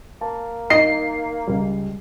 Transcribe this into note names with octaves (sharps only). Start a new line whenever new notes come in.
A#3 A5
D#4 D#5 C7
C#2 G3